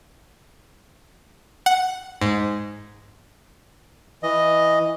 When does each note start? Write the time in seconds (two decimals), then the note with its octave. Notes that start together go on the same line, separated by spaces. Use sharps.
1.66 F#5
2.21 G#2
4.23 E3 D#5